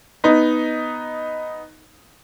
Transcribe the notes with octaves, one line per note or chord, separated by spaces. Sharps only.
B3 D#4